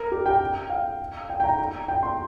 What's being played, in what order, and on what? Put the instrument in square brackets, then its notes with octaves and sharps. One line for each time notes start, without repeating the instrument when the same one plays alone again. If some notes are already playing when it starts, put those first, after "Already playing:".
Already playing: [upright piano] A#4
G4
G5
F5
G5
G5
A#5
A#5
G5
C6